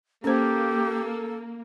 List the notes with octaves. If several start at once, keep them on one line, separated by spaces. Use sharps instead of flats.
A#3 C#4 G4 A4 C5